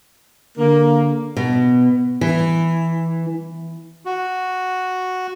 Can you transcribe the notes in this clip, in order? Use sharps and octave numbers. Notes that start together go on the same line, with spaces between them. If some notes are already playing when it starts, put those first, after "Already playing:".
D3 A#3
B2
E3
F#4